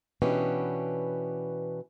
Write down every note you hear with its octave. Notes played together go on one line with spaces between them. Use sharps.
B2 E3 B3 C#4 D4 G4